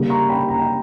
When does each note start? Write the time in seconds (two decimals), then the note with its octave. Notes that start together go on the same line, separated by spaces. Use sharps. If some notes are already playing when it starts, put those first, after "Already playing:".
Already playing: C#3 G3 A#3
0.10 A#5 C#6
0.29 G5 B5
0.49 A#5
0.59 G5